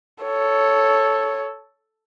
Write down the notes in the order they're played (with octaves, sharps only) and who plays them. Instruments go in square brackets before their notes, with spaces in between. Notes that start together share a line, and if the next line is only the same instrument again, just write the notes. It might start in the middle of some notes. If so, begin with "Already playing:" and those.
[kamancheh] A4 C#5